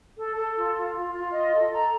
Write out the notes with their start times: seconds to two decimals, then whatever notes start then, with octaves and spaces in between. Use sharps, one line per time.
0.17 A4
0.36 A4
0.56 F4
0.76 F4
0.94 F4
1.14 F4
1.33 D#5
1.53 A4
1.72 A#5